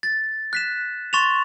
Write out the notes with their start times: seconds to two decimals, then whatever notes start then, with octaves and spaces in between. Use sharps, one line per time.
0.03 A6
0.53 F#6 B6 E7
1.13 C6 C#6 A6 E7 F7